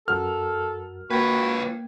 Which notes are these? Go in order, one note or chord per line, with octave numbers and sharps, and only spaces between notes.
F#2 F#4 A4 A#4 F6
A#3 F4 F#4 B4 G5 G#6